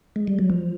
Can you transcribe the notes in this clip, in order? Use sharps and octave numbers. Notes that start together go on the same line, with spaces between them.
G#3
G3
F#3
F3